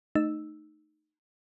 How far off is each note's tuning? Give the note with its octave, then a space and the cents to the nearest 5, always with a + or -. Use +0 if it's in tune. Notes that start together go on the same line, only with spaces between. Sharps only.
A3 +0 D#4 -15 E6 +0